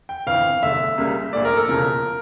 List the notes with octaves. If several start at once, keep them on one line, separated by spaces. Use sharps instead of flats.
G5
G1 F2 E3 F5
F1 E2 D3 A3 E5
C#2 C#3 G3 A#3
A#1 A#2 A3 D5
A#4
A4
E1 E2 C#3 F3 A#4